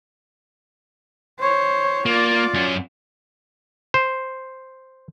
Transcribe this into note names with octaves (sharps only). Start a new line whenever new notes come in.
C5 C#5
A#3 F4 D5
F#2 C#4
C5